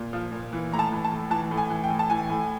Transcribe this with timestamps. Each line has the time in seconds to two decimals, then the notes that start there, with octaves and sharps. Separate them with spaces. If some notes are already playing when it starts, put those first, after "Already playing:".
Already playing: A#2
0.13 F3
0.32 A#2
0.53 E3
0.72 A2 A#5
0.79 A5
0.92 E3
1.05 A5
1.12 A2
1.30 E3 A5
1.51 A2
1.57 G#5
1.70 E3
1.84 G5
1.90 A2
1.99 A5
2.10 E3 G#5
2.29 A2